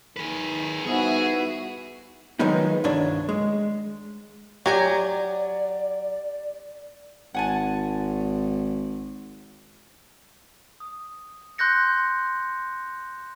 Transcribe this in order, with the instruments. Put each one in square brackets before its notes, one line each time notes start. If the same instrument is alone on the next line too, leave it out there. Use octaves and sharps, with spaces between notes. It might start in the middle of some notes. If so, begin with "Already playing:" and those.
[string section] D#3 [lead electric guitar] G#4 B4
[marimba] G3 D#4 C5 [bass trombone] B3 [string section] E4 F#4 E5 [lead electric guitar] G#4
[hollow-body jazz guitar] D#3 F3 F#3 G#3 B3 D#4
C2 G2 D#3 D4 C#5
G#3
[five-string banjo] F#3 G#5 A#5 [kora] G4 [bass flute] D5
[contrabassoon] G#1 [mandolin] F#5 G#5 A5
[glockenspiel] D#6
C6 F#6 G6 A#6 C#7